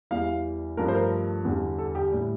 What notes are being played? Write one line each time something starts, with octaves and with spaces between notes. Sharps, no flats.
E2 E3 G3 F5
G2 F3 A3 A#4
C5
A#4
E2 D3 G3
A4
G4
A2 G3